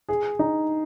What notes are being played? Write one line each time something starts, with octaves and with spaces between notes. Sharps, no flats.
G#4
D#4